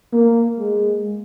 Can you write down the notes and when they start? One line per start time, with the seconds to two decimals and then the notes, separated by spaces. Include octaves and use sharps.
0.13 A#3
0.59 G#3